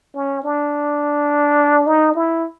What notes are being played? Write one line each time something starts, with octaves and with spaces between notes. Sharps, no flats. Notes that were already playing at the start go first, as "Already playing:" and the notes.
C#4
D4
D#4
E4